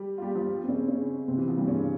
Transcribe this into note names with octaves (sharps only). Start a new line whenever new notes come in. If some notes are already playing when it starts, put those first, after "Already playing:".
Already playing: G3 G4
F4
G3 G4
F3 F4
C4
C#3 C#4
C#3 C#4
C3 C4
E3
F3
G2 G3
C#3 C#4